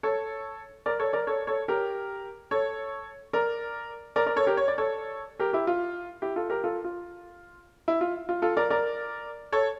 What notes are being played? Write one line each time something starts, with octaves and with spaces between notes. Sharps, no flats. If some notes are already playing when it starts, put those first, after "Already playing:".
A4 C#5
A#4 D5
A4 C#5
A#4 D5
A4 C#5
A4 C#5
G4 A#4
A4 C#5
A#4 D5
A#4 D5
A#4 D5
A4 C#5
G4 A#4
C#5
D5
A4 C#5
G4 A#4
E4 G4
F4
E4 G4
F4 A4
G4 A#4
F4 A4
F4
E4
F4
F4
F4 A4
A#4 D5
A#4 D5
A4 C#5